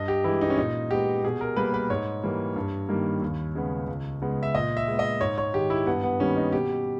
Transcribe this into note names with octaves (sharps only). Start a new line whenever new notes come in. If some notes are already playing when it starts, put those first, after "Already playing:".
Already playing: G2 D#5
G4
E3 G#3 E4
D#4
C#4
A#2 D#4
G#3 B3 G4
B2 G#4
A#4
G3 A#3 B4
B4
G#2 C#5
E3 G3 A#3
G2
D#3 G3 A#3
D#2
C#3 G#3 B3
C#2
C#3 G#3 B3
E5
A#2 D#5
E5
G#3 B3
D#5
G#2 C#5
C#5
D#3 G#3 G4
E4
G2 B3
B3
D#3 G3 A#3 C#4
D#4
B2 G4